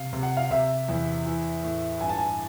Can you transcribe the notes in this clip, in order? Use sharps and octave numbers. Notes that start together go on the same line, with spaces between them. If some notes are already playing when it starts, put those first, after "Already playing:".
Already playing: C3 F5
C3
F#5
F5
C3 E5
E2
E3
A2
G2 G#5
A5
G#5